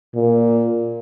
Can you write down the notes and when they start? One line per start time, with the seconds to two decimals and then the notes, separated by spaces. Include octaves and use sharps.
0.15 A#2